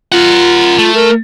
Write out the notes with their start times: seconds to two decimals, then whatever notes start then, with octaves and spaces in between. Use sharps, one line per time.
0.12 F4 A#4 F#5
0.79 A3
0.95 A#4